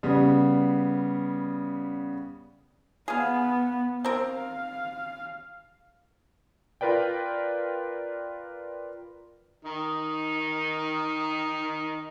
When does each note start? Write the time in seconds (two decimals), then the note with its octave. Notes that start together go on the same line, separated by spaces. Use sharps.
0.03 C#3 G3 B3
3.08 B3 G#4 F5
4.04 C4 A#4 F5
6.81 F4 A#4 B4 D5 G5
9.65 D#3 D#4